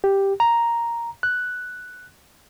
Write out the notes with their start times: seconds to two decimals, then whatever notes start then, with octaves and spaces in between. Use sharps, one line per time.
0.04 G4
0.40 A#5
1.23 F#6